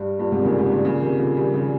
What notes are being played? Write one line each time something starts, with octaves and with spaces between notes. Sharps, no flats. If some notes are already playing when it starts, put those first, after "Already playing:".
Already playing: G2
G2 A#2
G#2 C3
D#3
A#2 C#3
G#2 C3
G2 A#2
A#2 C#3
C3 D#3
C#3 F3
D#3 G3
C#3 F3